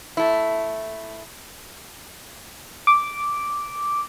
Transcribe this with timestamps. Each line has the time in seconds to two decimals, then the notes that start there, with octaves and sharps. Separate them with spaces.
0.17 A3 E4
2.87 D6